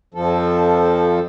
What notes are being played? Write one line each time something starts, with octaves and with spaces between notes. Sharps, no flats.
F2 F3 A4